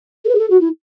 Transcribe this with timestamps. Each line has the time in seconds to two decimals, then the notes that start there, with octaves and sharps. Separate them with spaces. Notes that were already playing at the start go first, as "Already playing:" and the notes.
0.25 A4
0.29 B4
0.35 G#4
0.39 A4
0.50 F#4
0.61 E4